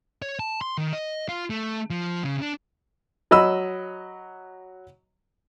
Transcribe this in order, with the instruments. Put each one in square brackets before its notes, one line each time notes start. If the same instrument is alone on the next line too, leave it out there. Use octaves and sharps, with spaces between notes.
[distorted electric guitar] C#5
A5
C6
D#3
D#5
F4
A3
F3
C#3
D4
[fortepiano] F#3 D#5 B5 E6